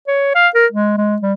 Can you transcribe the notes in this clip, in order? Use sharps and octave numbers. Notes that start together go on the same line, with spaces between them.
C#5
F5
A#4
G#3
G#3
G3